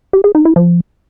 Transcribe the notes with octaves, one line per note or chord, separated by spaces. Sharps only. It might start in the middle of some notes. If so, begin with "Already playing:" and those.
G4
G#4
D#4
E4
F3